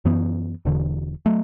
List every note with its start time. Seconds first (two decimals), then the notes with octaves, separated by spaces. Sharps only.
0.05 F#2 E3 B3
0.65 E1 E2 D3
1.26 F#3 A3